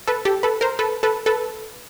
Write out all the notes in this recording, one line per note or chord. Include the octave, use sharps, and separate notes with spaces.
A4 B4
G4 A4
A4 B4
A#4 C5
A4 B4
A4 B4
A4 B4